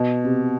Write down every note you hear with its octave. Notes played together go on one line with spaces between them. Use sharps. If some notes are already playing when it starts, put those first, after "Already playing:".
Already playing: B2
C3